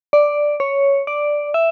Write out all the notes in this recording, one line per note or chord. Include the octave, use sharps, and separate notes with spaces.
D5
C#5
D5
E5